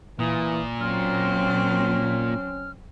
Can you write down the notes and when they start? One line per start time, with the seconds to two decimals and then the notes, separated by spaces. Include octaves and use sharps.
0.19 A#2 E3 D#6
0.80 F#3 C4 C#4 F6